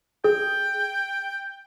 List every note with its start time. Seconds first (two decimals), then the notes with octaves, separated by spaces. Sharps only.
0.24 G#4 G5